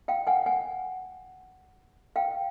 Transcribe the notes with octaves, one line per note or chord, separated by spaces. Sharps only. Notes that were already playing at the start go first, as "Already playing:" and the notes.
F5 G5
F#5 G#5
F#5 G#5
F5 G5